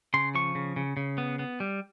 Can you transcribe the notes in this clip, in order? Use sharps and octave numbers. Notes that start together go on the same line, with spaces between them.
C#3 C6
F3 C#6
C#3
C#3
C#3
B3
B3
G3